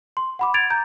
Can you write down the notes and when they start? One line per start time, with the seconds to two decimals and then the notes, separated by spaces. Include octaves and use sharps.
0.17 C6
0.39 F#5 B5 D6
0.54 G#6 A6 D7 F7
0.70 A#5 G6